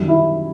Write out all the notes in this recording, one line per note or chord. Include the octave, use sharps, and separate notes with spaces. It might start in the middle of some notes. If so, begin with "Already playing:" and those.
Already playing: F#2 D#3 G3
E4